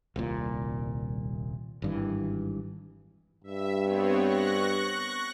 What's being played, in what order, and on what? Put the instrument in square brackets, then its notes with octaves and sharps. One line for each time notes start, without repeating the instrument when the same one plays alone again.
[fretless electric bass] D#1 C2 A#2
G#1 G2 E3
[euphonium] G2 [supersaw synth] E5
[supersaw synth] B3 C4 C#5
C#6 F#6 A#6